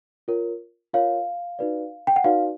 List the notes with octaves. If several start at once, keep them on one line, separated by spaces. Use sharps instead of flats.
F4 A#4 C#5
F4 A#4 C#5 F5
D#4 F#4 B4 D5
G5
F#5
D#4 F#4 B4 D5 F5